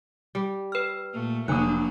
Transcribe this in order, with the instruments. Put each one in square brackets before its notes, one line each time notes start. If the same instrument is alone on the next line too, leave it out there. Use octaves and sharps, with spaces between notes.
[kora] G3
[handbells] B4 F6
[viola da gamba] A#2 A3
[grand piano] F1 D#6 [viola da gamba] F#3 A#3 D4 [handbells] G#5 F#6